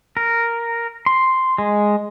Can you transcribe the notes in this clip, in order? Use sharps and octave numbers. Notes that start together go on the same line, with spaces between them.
A#4
C6
G#3